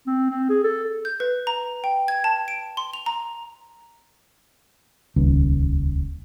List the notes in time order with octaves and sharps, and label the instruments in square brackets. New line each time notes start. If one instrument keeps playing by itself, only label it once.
[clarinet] C4
C4
G#4
A4
[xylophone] G6
B4
A#5
G5
G#6
A5
D7
C6
F7
A#5
[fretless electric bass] D#1 C#2